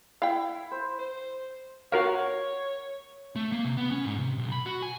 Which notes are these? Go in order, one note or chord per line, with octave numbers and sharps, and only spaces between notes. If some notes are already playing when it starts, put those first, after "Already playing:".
E4 F5 G5
C5
C5
F#4 A#4 C#5 F5
A3
A#3
C3
B3
C#4
G#2
C3
B1
B5
F#4
G#5